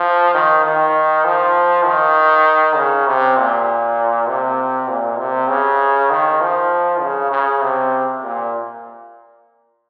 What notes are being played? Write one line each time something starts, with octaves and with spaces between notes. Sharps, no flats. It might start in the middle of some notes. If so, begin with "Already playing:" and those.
Already playing: F3
D#3
D#3
F3
D#3
C#3
C3
A#2
C3
A#2
C3
C#3
D#3
F3
C#3
C#3
C3
A#2